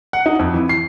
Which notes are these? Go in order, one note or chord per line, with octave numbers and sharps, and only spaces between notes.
F#5
D#4
F2
E3
C7